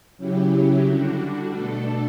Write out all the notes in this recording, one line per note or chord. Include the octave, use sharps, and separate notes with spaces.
C#3 F#3 C#4 E4 G4
D3 G3 D4 F#4
B2 A3 D4 A4